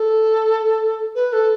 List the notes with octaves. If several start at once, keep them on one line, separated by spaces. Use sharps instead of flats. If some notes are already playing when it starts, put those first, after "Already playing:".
Already playing: A4
B4
A4